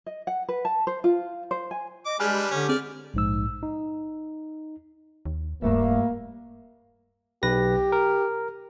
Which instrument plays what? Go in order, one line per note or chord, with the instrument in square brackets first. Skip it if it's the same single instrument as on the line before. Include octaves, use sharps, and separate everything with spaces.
[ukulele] D#5
F#5
B4
A5
C5
F4
C5
G#5
[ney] D#5 [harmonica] D6
[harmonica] G3 D4 B4 [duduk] G#3 [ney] G#4 [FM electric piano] G#5 F6
[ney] G4
[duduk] D3 [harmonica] C#4
[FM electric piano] C4 G#4 [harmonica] D5 F6
[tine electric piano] A#1 G#2 E6
D#4
[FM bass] D#2
[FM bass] D1 [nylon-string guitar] G2 A3 E5 [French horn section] A#3
[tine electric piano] B1 B4 A#6 [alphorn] G4
[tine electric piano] A#4